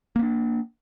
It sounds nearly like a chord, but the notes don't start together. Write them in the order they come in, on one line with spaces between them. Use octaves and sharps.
A#3 B3 D4